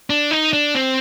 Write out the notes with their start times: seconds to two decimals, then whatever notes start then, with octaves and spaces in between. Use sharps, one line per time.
0.10 D4
0.31 D#4
0.53 D4
0.75 C4